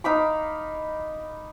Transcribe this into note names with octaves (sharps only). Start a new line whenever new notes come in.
D#4 F5 B5 D6